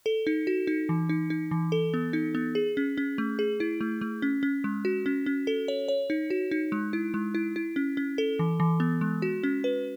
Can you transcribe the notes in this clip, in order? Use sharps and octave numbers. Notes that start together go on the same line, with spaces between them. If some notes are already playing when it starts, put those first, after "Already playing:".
A4
D#4
F#4
D#4
E3
D#4
D#4
E3
A4
B3
D#4
B3
G#4
C#4
C#4
A3
G#4
E4
A3
A3
C#4
C#4
G#3
F#4
C#4
C#4
A4
C#5
C#5
D#4
F#4
D#4
G#3
E4
G#3
E4
E4
C#4
C#4
A4
E3
E3
B3
G#3
F#4
C#4
B4